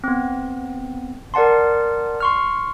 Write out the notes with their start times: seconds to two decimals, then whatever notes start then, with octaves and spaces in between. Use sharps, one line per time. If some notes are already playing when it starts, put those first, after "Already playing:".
0.04 B3 C4
1.34 A#4 D5 F#5 A5 C6
2.20 C6 C#6 F6